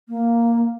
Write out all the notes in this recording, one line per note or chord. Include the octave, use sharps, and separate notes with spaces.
A#3